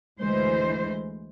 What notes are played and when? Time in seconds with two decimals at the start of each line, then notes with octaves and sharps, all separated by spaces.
0.20 D2 E3 G#3 C5